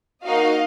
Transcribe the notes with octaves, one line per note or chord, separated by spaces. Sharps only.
A#3 D#4 F#4 D#5 F5